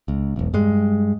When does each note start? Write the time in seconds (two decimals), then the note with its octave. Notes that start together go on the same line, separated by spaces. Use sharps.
0.08 C#2
0.36 E1 B1
0.54 G2 G#3